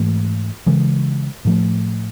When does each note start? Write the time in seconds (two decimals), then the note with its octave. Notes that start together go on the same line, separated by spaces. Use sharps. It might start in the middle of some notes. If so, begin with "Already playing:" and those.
Already playing: G#2 E3 A3
0.66 C#3 E3 G#3
1.45 A2 F3 A3